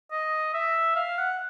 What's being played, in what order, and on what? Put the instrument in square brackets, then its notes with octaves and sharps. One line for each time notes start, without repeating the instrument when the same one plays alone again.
[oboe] D#5
E5
F5
F#5